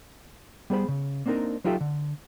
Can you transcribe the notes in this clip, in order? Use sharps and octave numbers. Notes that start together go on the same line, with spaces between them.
G3 B3 G#4 C5 B5
C#3
A#3 C4 D4 D#4 A#4
F#3 D#4 F4 G4 A4 E5
D3